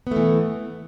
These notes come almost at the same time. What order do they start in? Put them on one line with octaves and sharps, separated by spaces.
B3 A3 E3